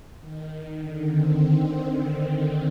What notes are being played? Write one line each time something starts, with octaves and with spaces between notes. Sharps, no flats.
D#3
D#3
D3
C4